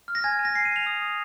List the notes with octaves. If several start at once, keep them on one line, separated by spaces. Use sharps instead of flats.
F6
A#6
G#5 G#6
G#5
A#6
G#5 C7
D#7
G#5 F7
D#6
D#6